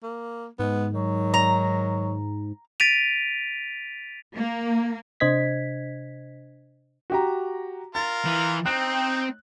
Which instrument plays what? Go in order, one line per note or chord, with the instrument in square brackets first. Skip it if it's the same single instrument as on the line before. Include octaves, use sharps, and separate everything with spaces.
[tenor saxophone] A#3
[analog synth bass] G#2 [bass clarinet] G#3 [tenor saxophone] B3
[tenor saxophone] D#3 [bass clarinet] F#3
[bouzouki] A#5
[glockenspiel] A6 B6 D7 D#7 F7
[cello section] A#3
[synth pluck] C3 D4 C5 D#5 G#6 B6
[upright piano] F#4 G4 A#5
[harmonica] F4 A#4 [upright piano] A6
[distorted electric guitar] E3
[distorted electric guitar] C4 [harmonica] D#4 G5 [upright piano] F#6